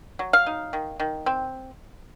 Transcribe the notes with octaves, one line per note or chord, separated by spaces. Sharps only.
F#3
F5
D#4
D#3
D#3
C4